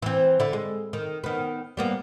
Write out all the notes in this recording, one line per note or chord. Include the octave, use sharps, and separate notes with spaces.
E3 C4
D3 E4
G#3
D#3
D#3 B3
G3 A#3 B3